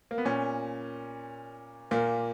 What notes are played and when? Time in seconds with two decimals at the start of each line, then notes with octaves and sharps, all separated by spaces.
0.11 A#3
0.18 B3
0.25 A#2 C#4
1.91 A#2 A#3